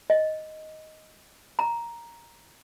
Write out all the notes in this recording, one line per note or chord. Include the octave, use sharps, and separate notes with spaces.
D#5
A#5